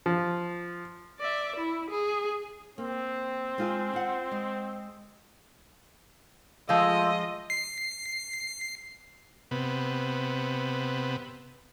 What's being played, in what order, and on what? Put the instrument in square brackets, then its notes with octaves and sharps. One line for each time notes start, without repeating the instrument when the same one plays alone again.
[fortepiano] F3
[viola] D5 E5
E4
G#4
[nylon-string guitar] A#3 [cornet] C4
[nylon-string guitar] G#3 F4 G#4
F4 F#5
G#3
[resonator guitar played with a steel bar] F3 G#3 [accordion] A3 F4 E6 [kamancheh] D#5 [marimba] F5
[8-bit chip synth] C7
[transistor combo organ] C3 B3